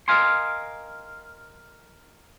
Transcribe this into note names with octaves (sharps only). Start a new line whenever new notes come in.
A#4 D#5 F5 G#5 C6